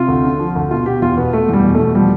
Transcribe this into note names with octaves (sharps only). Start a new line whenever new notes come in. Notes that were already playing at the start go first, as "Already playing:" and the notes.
Already playing: C3 F4
D2
D3
F3
D2
B2 F4
B2 G4
E2 F4
B2 B3
B2 A3
E2 G3
B2
A3
E2
F3 G3